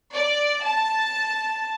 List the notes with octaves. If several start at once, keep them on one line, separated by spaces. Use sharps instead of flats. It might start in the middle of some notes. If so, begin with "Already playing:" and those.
D5
A5